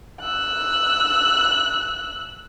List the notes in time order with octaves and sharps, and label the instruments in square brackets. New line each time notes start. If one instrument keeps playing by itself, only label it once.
[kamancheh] E6 F#6